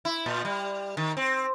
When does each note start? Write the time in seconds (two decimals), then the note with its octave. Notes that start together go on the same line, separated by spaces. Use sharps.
0.05 E4
0.26 A#2
0.45 G3
0.97 D#3
1.17 C4